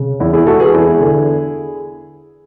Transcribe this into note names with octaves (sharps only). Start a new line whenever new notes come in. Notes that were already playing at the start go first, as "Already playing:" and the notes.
Already playing: C#3
E2 E4
E4 G#4
G#3 F#4 A4
G#4 B4
E2 E4 G#4
D3